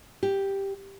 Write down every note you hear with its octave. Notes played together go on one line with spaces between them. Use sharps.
G4